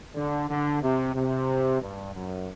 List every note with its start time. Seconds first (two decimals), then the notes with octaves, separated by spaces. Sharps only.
0.16 D3
0.49 D3
0.82 C3
1.15 C3
1.81 G2
2.14 F#2